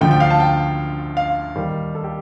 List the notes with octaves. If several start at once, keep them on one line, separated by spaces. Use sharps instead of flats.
D2 D3 F3 A3 G5
G5
F5
A5
G5
F5
D#2 D#3 G3
A4
G4